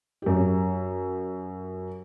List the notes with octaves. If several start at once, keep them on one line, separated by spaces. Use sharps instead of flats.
F#2 G4